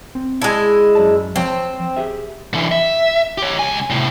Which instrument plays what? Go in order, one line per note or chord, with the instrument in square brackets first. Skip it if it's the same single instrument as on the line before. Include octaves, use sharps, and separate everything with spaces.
[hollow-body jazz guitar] C4
[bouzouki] G#3 E4 [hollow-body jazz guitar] D5 A5
[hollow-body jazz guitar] F#2 D5 A5
[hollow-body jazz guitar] F3 C#5 F5 [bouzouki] C4
[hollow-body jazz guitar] G4 G#4 E5
[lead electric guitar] D3 E3
E5
G4 C#5
C#2 G#5
A2 C3